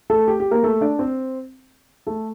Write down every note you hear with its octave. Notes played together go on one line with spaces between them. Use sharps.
A3 A4
G4
G4
A#3 A#4
A3 A4
D4 D5
C4 C5
A3 A4